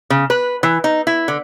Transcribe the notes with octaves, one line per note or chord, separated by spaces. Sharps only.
C#3
B4
E3
D#4
E4
D3